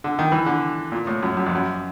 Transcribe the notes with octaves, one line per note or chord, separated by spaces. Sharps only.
D3
D#3
E3
D3
A#2
A2
F#2
F#2
F2
F#2